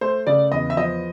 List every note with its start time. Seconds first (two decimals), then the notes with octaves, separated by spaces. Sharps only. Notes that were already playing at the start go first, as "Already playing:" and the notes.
0.01 A3 C5
0.27 C#3 D5
0.52 E2 D#5
0.70 E5
0.77 F3 D#5